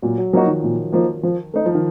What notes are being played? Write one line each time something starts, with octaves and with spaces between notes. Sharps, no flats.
A#2 F#3
F#3
F3 F#3 A#3 D#4 F#4
D#3
A#2
F3 A#3 D#4
F3
A3 D#4
F3
D#3